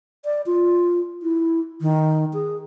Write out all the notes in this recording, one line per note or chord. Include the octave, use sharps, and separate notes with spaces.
D5
F4
E4
D#3
G#4